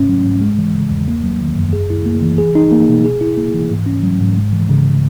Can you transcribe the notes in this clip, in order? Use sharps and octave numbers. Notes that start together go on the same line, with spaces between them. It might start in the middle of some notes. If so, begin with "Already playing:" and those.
Already playing: G#2 C#4
F#3
G#2
G#3
E3
C#3
E2
A#3
F#3
D#3
F#2
G#4
E4
A#3
E3
G#4
D#4
A#3
B2
G#4
E4
A#3
E3
G#2
C#4
F#3
G#2
G#3
E3
C#3